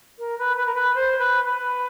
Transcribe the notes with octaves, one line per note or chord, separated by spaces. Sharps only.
A#4
B4
B4
A#4
B4
C5
B4
B4